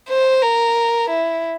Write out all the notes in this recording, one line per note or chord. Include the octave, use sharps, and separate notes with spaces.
C5
A#4
E4